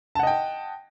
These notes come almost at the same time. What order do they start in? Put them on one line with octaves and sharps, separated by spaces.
A5 F#5 D#5 G5